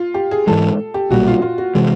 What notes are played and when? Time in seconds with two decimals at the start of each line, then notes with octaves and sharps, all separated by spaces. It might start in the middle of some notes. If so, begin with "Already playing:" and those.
Already playing: F4
0.14 G4
0.31 G#4
0.47 G#2 E3 G#3 A4
0.94 G4
1.10 B1 A#2 G3 F#4
1.27 F4
1.42 F4
1.58 F#4
1.75 C3 E3 G#3